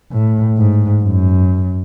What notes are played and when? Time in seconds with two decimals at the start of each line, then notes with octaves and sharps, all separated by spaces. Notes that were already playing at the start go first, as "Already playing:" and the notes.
0.12 A2
0.58 G#2
1.03 F#2